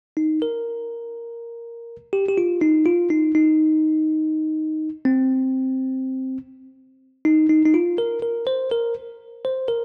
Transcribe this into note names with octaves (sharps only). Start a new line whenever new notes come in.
D#4
A#4
G4
G4
F4
D#4
F4
D#4
D#4
C4
D#4
D#4
D#4
F4
A#4
A#4
C5
A#4
C5
A#4